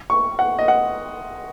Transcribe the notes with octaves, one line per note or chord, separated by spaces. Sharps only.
C#6
F#5
D#5
F#5